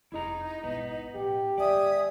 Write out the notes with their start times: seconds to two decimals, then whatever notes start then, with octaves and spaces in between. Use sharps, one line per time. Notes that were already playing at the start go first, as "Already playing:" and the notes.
0.12 F1 D#4 E4 G#4 A#5
0.63 G#1 B2 B3
1.15 A2 G4
1.58 D#3 G#3 D5 E5 G#5 D#6